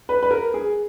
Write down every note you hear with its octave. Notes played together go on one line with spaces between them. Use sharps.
B4
B4
A#4
G#4